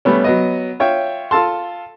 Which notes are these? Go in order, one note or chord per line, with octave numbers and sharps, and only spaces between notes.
G3 A3 B3 C#4
F#3 B3 D#5
F4 C#5 E5 G5
F4 A4 A5 C6